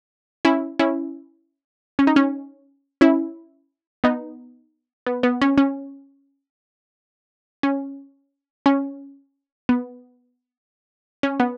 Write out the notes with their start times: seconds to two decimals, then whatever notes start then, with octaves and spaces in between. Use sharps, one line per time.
0.45 C#4 E4
0.79 C#4 E4
1.99 C#4
2.07 D#4
2.16 C#4
3.01 C#4 E4
4.04 B3 D#4
5.07 B3
5.23 B3
5.42 C#4
5.58 C#4
7.63 C#4
8.66 C#4
9.69 B3
11.23 C#4
11.40 B3